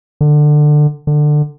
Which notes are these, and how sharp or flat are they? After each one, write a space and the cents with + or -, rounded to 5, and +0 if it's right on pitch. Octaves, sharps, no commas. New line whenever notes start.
D3 +20
D3 +20